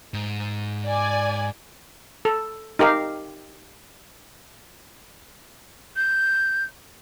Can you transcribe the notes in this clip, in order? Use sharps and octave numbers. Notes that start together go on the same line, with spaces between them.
G#2
D5 G#5
A4
D#4 G4 A#4 F5
G6